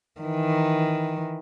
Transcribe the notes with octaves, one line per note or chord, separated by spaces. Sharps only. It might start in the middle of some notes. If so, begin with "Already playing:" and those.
D#3 E3